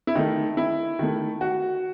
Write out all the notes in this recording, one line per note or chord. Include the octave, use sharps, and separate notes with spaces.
E4
D#3 A3 D#4
E4
D#3 A3
F#4